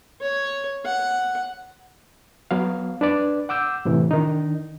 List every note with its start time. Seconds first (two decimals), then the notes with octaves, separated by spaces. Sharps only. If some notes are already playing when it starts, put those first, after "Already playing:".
0.21 C#5
0.85 F#5
2.51 F#3 B3 F5
3.01 D4 B4 D5
3.49 F#5 D6 E6 G6
3.85 A2 C3 E3
4.11 D#3 D4 D#4